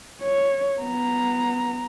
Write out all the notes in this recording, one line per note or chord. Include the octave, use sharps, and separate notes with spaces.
C#5
B3 A#5